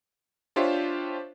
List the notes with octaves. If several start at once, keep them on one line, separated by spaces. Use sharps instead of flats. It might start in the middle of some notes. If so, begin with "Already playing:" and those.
D4 F4 G4 C5 C#5 E5